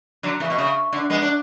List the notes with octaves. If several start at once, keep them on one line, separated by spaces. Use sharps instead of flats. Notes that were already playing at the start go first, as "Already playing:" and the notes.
D3 F#3
C#3 E3
B2
C#3
D3
G#3 B3
D4